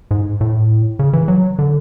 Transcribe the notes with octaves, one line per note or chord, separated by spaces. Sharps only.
G#2
A2
C#3
E3
F#3
D3